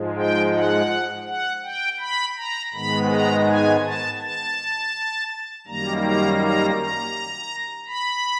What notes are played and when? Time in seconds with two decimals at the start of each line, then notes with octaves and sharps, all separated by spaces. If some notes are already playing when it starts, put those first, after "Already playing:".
Already playing: G#2 F3 G#3
0.16 G5
0.53 F#5
1.27 F#5
1.64 G5
2.00 B5
2.37 A#5
2.74 G#2 D#3 G#3 B3 B5
3.11 A#5
3.47 G#5
3.84 A5
4.21 A5
5.67 F#2 D#3 G3 A#3 A#5
6.04 A#5
6.41 A#5
6.79 A#5
7.88 B5